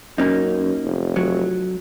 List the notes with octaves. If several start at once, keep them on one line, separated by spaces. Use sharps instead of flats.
F#2 A#3 C#4 D#4
F1
F#3